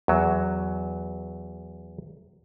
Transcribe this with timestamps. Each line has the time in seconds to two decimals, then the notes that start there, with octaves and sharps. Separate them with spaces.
0.08 E2 F#3